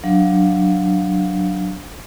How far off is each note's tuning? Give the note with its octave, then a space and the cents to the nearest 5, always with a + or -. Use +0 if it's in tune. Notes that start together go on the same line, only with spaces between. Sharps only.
F#3 +0 D4 +0 F5 +0